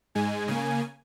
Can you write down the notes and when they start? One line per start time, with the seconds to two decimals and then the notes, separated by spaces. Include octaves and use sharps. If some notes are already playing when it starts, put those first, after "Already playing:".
0.15 G#2 G#3 G#5
0.48 C#3 A#3 G#5